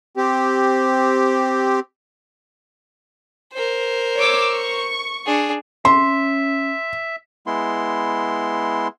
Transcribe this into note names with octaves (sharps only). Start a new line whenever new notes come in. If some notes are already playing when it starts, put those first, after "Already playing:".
C4 G4
A#4 C5
C#5 D6 E6
C#6
D4 G#4
C#4 E5 C6
G#3 B3 E4 C6